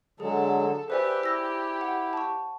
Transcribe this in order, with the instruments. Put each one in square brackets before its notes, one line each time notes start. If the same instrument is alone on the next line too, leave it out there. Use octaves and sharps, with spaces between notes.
[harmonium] D3 F#3 G#3 [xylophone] G#4 [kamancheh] A4
[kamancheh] G4 [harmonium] B4 E5 [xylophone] C5 D5 G#5
[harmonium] E4 [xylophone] E6 A#6
[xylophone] F#5
A5 C#6